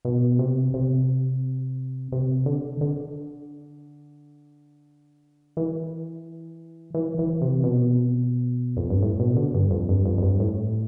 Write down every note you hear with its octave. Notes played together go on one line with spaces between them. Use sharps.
B2
C3
C3
C3
D3
D3
E3
E3
E3
C3
B2
F2
G2
A2
B2
D3
G2
F2
G2
F2
F2
G2
A2